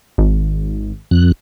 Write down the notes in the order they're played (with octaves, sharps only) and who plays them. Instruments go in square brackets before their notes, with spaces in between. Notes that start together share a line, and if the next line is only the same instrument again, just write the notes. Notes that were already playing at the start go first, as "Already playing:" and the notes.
[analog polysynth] G#1
[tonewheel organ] F2 F#6